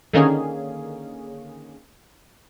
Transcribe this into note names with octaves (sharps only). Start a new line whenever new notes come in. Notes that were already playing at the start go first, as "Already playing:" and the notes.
D3 D#3 A#3 C#4 G#4